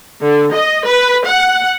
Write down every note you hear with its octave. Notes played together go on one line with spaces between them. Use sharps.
D3
D#5
B4
F#5